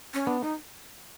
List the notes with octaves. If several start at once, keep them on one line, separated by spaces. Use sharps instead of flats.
C#4
B3 D4
D#4